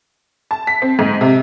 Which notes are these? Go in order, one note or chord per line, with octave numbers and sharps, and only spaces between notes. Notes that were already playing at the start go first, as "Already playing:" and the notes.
A5
B6
C4
G#2
C3